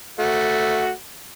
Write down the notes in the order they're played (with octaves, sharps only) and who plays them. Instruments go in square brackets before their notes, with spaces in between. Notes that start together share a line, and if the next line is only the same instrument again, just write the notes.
[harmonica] A3 F#4